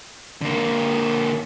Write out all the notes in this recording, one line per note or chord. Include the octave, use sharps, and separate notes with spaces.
D3 A#3